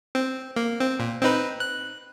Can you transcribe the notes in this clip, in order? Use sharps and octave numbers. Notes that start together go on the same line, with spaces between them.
C4
A#3
C4
A#2
C4 D#4 B4
F#6